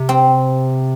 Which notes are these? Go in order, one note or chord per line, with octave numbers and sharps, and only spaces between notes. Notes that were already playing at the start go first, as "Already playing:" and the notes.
Already playing: C3
C4